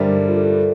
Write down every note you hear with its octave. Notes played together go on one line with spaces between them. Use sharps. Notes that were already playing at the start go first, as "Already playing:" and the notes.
Already playing: G2 D3 G3 A#4 C5 D5 E5
F4 A4